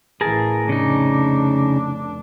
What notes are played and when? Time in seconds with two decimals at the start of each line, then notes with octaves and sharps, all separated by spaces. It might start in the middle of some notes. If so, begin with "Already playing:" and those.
0.21 A1 E3 G#4 A#4 A5
0.69 F1 C#3 D4 D#4